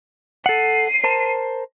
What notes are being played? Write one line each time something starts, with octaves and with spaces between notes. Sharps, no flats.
A4 F#5 C7 D#7
A#4 C5 A5